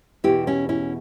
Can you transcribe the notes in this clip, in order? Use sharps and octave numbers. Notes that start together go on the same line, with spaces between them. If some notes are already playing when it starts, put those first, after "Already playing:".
E2 B2 E4 G4
C#4 E4
C#4 E4